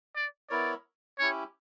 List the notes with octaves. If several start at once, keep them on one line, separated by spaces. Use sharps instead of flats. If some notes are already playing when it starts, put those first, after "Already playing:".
D5
B3 E4 A#4 C#5 D5
C#4 E4 G4 C#5